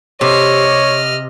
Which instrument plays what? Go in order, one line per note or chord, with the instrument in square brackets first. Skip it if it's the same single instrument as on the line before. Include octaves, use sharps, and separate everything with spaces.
[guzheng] C3 [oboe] C#5 [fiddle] D#5 F6